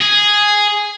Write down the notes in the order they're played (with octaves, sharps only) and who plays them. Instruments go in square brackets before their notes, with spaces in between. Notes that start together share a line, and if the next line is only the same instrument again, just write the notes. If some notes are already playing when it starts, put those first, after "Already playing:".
[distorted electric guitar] G#4